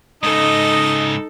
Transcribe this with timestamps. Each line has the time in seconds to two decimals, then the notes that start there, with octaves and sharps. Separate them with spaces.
0.23 G#2 C#3 D#4 A4 D#5